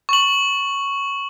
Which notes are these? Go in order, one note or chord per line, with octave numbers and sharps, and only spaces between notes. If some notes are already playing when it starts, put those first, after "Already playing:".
C#6 F#7